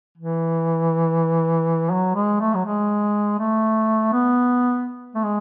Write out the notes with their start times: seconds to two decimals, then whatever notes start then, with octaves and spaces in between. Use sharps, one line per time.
0.18 E3
1.92 F#3
2.15 G#3
2.40 A3
2.54 F#3
2.65 G#3
3.39 A3
4.13 B3
5.15 A3
5.24 G#3